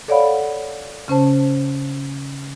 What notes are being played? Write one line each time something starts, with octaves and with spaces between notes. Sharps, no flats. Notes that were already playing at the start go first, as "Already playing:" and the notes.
A4 C#5 D5 F5 F#5 B5
C#3 C#4 C5 A5